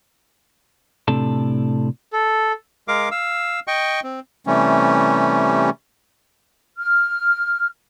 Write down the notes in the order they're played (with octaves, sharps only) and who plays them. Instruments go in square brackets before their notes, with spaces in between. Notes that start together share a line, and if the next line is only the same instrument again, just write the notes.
[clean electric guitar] A2 C3 D4 A4 A5
[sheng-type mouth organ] A4
[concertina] G#3 A#4 F5 D6
F5 E6
D#5 G5 C#6
C4
[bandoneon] C3 E3 G3 A3 C#4
[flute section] F6